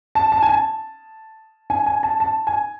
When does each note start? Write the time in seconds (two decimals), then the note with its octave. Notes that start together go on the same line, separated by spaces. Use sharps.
0.15 A5
0.32 A5
0.42 G#5
0.49 A5
1.70 G#5
1.86 G#5
2.03 A5
2.20 A5
2.47 G#5